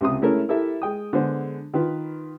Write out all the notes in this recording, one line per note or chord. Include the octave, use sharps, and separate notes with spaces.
C#2 C3 C6 D#6
G#3 A3 C#4 E4 A4 A#4
E4 G4 A4 A#4 E5
G#3 G5 D#6
D3 G#3 B3 G#4 C5
D#3 F4 B4